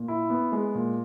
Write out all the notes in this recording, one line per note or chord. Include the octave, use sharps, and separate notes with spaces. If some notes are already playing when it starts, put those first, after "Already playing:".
Already playing: A#2
E4
B3
G#3
A#2